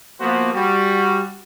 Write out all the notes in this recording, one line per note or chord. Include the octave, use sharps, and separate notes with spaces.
F3 A#3 B3 F#4 C5
G3 F#4